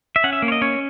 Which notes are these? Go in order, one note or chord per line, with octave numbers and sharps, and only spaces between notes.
E5
C#4 F#5
E5
A#3
C#5
D#5
C#4 C#5